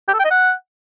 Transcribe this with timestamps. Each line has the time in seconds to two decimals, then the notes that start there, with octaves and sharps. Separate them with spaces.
0.08 G4
0.14 A4
0.19 G5
0.25 D#5
0.31 F#5